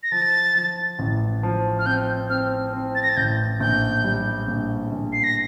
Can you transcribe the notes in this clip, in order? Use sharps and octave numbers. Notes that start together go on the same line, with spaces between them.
A#6
F3 A6
F3
A1
F3
F6
C4 G6
C4 F6
C4
A6
A#6
A6
A1 G6
A#1 G6
G3
A#1
A#1
C7
A#6